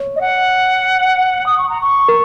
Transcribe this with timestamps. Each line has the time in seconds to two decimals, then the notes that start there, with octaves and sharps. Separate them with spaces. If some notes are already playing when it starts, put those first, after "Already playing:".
Already playing: C#5
0.16 D#5
0.21 F#5
1.46 D#6
1.58 C#6
1.69 A#5
1.81 C#6
2.08 A#4